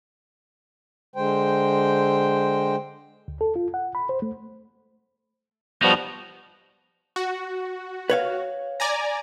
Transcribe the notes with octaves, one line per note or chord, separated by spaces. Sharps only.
D3 G#3 C5 G5
D2
A4
F4
F#5
B5
C5
A3
F3 G3 B3 D#4 F#4
F#4
B4 C#5 F5
D5 G#5 A#5